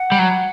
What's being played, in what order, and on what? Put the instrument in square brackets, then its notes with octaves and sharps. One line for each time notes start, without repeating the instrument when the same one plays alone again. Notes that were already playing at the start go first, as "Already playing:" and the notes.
Already playing: [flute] F#5
[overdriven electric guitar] G3
F#3